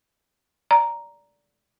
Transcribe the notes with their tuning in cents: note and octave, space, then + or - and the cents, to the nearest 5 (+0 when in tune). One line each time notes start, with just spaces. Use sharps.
D5 -15 A#5 +0